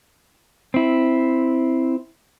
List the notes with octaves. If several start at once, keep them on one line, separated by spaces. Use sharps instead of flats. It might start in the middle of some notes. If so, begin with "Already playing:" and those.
C4 E4